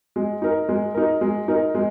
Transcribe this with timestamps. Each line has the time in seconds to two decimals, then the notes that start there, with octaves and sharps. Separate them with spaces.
0.16 G#3
0.42 D#4 A#4
0.69 G#3
0.95 D#4 A#4
1.21 G#3
1.48 D#4 A#4
1.75 G#3